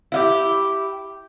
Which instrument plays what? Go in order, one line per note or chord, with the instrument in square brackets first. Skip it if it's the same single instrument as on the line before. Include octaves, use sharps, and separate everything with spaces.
[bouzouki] E4 F4 G4